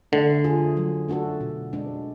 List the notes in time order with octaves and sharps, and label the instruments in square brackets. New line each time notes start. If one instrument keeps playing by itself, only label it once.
[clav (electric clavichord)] D3 [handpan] A3
[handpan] F4 G#4
F#3
A3 D4 F#4 A4
B2
G#3 D4